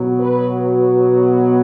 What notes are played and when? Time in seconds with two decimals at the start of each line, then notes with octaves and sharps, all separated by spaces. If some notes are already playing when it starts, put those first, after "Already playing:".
Already playing: B2 F#3 B3
0.20 B4
0.60 F#4